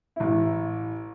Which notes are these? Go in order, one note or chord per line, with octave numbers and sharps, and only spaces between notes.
A1 E4